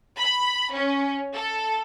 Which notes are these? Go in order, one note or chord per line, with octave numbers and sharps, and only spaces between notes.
B5
C#4
A4